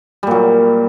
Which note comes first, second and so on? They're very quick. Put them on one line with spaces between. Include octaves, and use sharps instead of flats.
G3 A#2 F#3